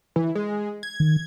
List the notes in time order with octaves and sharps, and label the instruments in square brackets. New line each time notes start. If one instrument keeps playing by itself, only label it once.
[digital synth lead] E3
G#3
G#6
[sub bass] D#3